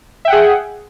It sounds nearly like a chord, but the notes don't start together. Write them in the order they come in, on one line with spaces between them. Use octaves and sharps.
E5 G5 F#5 G#4